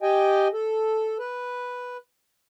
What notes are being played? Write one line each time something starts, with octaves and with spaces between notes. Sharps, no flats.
G4 D#5 G5 G#5
A4
B4